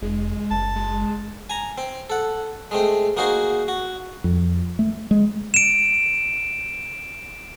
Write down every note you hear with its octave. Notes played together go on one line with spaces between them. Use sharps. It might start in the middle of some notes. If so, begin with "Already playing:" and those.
F1 G#3
F#1 A5
G#3
G#5 A#5
C4
A4 F#5
G#3 A3 C4
A#3 D#4 F#4 G#4 C5
F#4
F2
A3
G#3
D7 E7